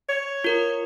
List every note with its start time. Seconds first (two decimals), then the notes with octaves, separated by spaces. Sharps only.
0.09 C#5
0.44 F4 A#4